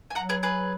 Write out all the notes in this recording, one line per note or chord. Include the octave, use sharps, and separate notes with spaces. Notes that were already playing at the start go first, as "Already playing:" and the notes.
G#5
F#3 F#5 A#5
G#4 B4
G#4 B4